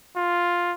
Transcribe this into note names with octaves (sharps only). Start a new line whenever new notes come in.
F4